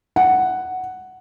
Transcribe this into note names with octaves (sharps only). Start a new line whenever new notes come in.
F#5